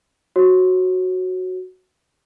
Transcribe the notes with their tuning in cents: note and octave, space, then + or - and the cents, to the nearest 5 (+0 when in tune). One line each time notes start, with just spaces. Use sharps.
F#4 +0 C#5 -40